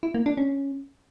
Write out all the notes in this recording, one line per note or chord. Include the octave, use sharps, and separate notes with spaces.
E4
A#3
D4
C#4